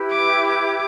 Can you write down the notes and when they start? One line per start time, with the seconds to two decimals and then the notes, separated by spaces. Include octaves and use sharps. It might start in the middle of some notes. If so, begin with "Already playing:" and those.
Already playing: E4 G4 B4
0.12 D6
0.47 D6